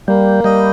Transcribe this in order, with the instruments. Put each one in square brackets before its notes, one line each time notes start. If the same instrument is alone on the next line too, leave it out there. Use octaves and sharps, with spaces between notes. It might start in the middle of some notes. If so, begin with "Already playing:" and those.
[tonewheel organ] G3 [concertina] A#3
[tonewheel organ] G3 [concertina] D#5